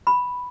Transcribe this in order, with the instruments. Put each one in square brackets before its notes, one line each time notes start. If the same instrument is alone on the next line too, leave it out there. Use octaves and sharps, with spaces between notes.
[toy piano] B5